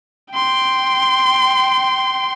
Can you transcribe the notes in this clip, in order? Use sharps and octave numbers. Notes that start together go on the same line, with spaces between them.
G5 C6